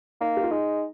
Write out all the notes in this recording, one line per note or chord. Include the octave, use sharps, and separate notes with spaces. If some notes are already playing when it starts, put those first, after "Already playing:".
A#3 D#4
G4
F4
G#3 D#4